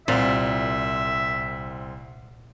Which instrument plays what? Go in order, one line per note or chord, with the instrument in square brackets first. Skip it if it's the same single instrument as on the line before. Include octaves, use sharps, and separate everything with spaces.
[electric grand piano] C2 C4 [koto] A#2 [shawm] E5